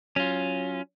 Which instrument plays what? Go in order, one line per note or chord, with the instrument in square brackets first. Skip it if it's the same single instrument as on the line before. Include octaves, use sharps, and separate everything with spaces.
[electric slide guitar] F#3 F4 [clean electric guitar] C#4